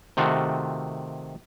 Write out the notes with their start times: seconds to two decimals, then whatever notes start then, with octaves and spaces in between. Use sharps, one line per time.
0.17 C3 D#3 A3 F4 F#4